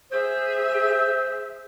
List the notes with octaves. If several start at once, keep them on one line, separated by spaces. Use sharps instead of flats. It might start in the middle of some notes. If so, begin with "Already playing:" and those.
G#4 C5 E5